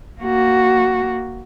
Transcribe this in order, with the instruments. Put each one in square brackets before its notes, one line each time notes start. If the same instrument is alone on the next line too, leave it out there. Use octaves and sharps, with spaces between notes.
[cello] A#3 F#4